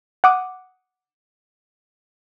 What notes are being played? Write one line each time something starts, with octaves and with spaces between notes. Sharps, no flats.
F#5 D6 D#6